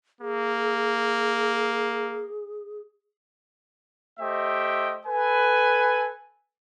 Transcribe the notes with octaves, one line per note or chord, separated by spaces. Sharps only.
A#3 G#4
A3 G4 C5 D#5 E5 G5
A4 B4 G#5